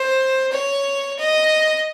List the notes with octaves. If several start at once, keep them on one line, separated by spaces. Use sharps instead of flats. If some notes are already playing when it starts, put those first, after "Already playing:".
Already playing: C5
C#5
D#5